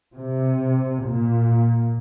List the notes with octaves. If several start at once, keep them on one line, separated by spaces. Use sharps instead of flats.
C3
A#2